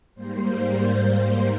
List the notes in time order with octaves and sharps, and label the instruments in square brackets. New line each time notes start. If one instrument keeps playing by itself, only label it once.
[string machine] G#2 G3 A#3 C5